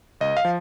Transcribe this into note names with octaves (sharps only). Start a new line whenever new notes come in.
C#2 D#5
F5
F3